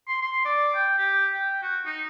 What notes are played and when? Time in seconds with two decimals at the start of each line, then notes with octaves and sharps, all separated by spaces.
0.08 C6
0.22 C6
0.45 D5
0.75 G5
0.98 G4
1.34 G5
1.63 F#4
1.86 D#4